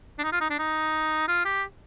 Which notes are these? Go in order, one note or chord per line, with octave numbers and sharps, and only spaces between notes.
D4
D#4
F4
D#4
D4
D#4
F4
G4